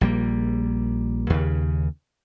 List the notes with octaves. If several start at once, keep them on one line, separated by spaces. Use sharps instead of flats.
A#1 G3 A#3
D#2 C#3